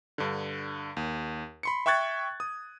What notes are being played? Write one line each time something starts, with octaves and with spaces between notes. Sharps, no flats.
G2 D3
D#2
B5 C6 C#7
E5 G5 C#6 F#6 G#6 A6
D#6